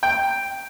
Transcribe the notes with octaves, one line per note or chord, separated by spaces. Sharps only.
G5